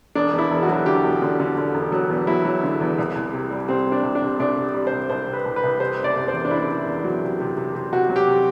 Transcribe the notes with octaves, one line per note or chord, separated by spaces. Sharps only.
E1 D4
E2
E4
E1
F#4
F#3
D3 G4
E1
D3
D3
D3
E1
F#3
E2
F#3 E4
F#3
D3
E2
C2
C2
C3
G3
C3 C4
G3
D4
C2
D4
C3
C2 D4
C3
G3
C5
C2
C2 C5
C3
B4
C2
B4
C2
C3 C5
F#1
D5
C3
C5
E2
D4
F#1 E4
F#1
E2
F#3
C3
C3
C3
C3
C3 F#4
F#3
G4
C3